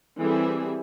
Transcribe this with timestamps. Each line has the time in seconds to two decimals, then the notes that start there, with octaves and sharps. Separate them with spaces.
0.19 E3 G3 C4 G#4 A4 E5